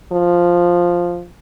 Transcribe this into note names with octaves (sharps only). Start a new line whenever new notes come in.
F3